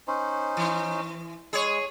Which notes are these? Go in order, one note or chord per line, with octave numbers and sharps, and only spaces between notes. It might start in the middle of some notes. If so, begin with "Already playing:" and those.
C#4 D#4 C5
E3
G#3 G#4 C#5